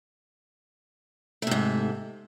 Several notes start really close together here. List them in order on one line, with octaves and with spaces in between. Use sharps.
A3 C3 G#2